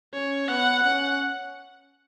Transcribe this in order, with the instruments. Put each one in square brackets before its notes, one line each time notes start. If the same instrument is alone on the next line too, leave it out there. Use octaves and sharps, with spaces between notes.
[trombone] C#4 [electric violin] C#5
[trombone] B3 [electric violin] F#5
[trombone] C#4 [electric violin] F#5